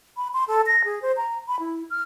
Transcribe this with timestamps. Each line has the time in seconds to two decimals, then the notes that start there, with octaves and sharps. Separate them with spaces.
0.17 B5
0.34 C6
0.48 A4
0.67 A#6
0.85 G#4
1.02 C5
1.17 A#5
1.48 B5
1.60 E4
1.90 F6